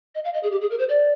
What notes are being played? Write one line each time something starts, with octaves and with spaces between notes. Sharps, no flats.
D#5
F5
D#5
G#4
G4
G#4
A#4
C5
D5